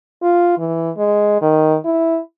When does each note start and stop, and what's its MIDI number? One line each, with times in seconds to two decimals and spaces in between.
0.22 0.57 65
0.58 0.91 52
0.97 1.38 56
1.42 1.76 51
1.85 2.19 64